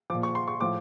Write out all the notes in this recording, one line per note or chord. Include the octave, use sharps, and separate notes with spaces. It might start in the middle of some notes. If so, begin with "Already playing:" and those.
A#2 F3 D6
C#6
C6
C#6
A2 F3 D6